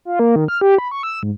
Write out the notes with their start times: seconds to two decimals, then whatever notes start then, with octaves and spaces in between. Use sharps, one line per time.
0.05 F4
0.19 A#3
0.36 D#3
0.48 F6
0.61 G4
0.78 B5
0.91 C#6
1.03 E6
1.23 G#2